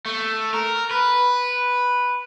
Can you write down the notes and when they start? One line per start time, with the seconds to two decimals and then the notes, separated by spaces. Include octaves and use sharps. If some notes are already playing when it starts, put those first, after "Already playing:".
0.06 A3
0.54 A#4
0.91 B4